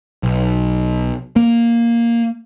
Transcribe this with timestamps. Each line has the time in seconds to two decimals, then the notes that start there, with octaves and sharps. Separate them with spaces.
0.23 B1
1.36 A#3